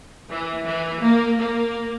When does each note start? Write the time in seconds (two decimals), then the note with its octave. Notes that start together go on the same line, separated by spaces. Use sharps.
0.28 E3
0.65 E3
1.01 A#3
1.38 A#3